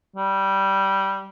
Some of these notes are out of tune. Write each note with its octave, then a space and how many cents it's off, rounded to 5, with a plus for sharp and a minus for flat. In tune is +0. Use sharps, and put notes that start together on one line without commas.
G3 -10